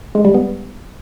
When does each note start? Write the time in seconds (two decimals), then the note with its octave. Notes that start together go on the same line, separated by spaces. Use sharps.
0.15 G#3
0.25 G3
0.34 B3